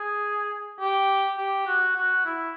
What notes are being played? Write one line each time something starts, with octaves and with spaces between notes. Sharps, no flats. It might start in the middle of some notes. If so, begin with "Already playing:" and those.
Already playing: G#4
G4
G4
F#4
F#4
E4